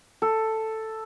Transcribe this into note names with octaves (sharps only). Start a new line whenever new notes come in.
A4